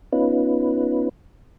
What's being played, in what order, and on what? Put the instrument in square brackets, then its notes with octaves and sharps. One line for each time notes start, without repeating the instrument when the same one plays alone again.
[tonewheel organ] B3 C#4 D#4 F4 B4